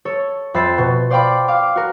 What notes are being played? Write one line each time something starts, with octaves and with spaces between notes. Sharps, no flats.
A4 C#5
F2 E5 B5 G6 A6 C7
B2
C5 D5 F5 G5 B5 D6
F5 D6
F#4 A#4